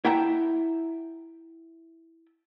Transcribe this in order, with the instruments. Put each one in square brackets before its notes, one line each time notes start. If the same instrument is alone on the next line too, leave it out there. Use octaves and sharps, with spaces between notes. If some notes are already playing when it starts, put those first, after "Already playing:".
[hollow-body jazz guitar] E4 E5 F#5 G5 A5 A#5